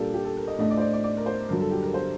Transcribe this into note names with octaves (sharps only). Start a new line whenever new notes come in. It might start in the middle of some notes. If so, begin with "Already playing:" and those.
Already playing: A#2 G3 A#3 D4 G4 A4
G4
A4
A#4
D#5
A2 A3 D4 D#5
D5
C5
D5
D5
D5
A#4
C5
G2 D3 F#3 A#4
A4
G4
A#4
C5